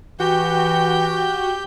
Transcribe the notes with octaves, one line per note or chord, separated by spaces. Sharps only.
E3 F#4 G4 G5 G6